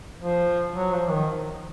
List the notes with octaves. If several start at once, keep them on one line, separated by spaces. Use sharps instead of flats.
F3
F#3
F3
D#3